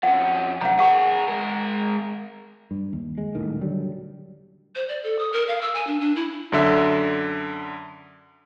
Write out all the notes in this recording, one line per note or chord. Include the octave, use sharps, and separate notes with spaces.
F2 C#4 F#5
F#2 C3 F#5 A#5
G#4 A#4 F#5 C#6
G#3 A#4
G2
D#2
G#3
D#1 B1 A2 D#3
D3 F#3 G3
C5
D5
A4
D#6
A#4
F5
E6
G#5
D4
D4
E4
F#2 D3 E5